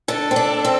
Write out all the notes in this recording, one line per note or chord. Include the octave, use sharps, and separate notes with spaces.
D3 A4
C4
D4
C4